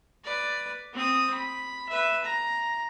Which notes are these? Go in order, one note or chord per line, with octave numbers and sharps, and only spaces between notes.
B4 D5
C4 D#6
B5
B4 E5
A#5